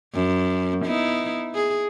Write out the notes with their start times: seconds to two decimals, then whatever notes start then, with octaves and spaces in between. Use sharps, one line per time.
0.15 F#2
0.85 B3 D#4 E4
1.55 G#4